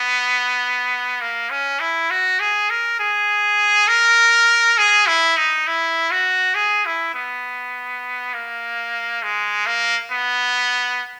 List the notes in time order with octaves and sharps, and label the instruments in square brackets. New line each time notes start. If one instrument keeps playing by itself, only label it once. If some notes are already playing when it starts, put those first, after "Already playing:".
Already playing: [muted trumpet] B3
A#3
C#4
E4
F#4
G#4
A#4
G#4
A#4
G#4
E4
D#4
E4
F#4
G#4
E4
B3
A#3
G#3
A#3
B3